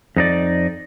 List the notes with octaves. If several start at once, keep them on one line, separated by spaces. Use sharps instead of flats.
F2 D#4 D5